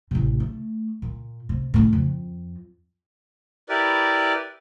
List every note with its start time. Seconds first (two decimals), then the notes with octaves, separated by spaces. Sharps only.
0.11 A1 C3
0.40 A3
1.02 A#2
1.49 C3
1.74 A2 C#3
1.93 F2
3.69 E4 G4 A#4 B4 D5